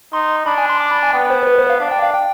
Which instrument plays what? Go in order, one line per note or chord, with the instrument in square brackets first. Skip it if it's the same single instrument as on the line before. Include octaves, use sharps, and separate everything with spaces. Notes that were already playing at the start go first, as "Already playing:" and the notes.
[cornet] D#4 [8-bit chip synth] C6
[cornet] D4 [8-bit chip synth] B5
[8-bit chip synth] G#5
C6
D6
B5
G#5
[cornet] B3 [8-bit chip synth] G5
[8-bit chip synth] C5
B4
C5
F5
[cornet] D4 [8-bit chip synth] F5
[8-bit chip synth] G5
F5
G5